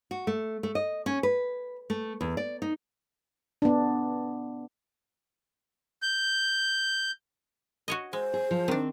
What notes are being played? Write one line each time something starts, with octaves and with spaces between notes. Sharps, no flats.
F#4
A3
A3
D#5
C#4
B4
A3
E2
D5
D#4
B3 D4
G6
F#4 C#5 D#5
G#3 C5
G#4
F3
D#3 C4 D4